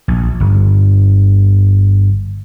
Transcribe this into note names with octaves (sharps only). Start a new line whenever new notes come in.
A#1
G1